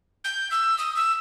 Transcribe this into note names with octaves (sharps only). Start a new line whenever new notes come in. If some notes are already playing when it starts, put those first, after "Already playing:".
G6
E6
D#6
E6